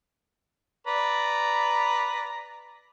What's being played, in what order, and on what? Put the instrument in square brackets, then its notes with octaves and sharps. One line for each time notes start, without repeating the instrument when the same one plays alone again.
[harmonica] B4 D5 A#5